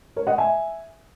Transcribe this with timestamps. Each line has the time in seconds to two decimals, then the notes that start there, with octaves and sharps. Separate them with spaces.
0.16 A#4 C#5
0.27 D#5 F#5
0.38 E5 G#5